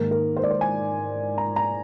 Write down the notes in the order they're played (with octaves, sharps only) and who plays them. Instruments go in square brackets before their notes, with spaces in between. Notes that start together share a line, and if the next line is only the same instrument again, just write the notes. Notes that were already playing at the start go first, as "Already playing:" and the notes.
Already playing: [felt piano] G#2 D#3 A#3 A#4
A#4
C5
D5
C5
G#5
A#5
A#5